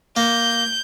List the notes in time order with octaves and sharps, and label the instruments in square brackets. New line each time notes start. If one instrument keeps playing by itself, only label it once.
[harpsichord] A#3 [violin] G6